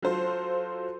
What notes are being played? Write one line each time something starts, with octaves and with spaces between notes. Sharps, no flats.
F#3 F4 A4 C5